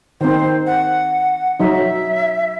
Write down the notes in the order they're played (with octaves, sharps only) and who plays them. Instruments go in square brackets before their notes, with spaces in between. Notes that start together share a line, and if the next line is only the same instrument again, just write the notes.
[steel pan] D#3 C4 [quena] C5
[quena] F#5
[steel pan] F#3 D#4 [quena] E5